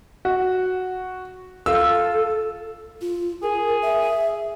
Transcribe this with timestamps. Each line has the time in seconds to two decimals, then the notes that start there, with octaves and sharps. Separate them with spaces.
0.25 F#4
1.66 F4 A4 E6
3.01 F4
3.43 G#4 A#4
3.82 E5